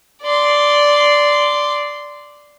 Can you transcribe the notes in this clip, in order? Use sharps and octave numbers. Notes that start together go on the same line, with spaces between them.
D5 C6